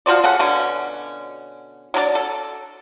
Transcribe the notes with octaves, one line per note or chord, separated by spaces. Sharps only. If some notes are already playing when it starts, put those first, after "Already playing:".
F3 F#4 C5 D5
C#3 A4 F#5
B2 D3 C#4
F#3 D4 A#4 D5
A4